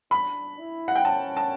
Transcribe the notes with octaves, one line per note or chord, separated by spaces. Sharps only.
D4 B5
E4
F#5
G5
C#4 A5
A5